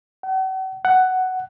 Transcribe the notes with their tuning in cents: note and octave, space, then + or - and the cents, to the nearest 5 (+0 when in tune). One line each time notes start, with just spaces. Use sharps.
F#5 +45
F#5 +10